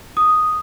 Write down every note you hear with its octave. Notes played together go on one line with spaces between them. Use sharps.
D#6